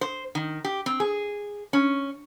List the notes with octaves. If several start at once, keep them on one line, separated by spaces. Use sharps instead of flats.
C5
D#3
G4
C4
G#4
C#4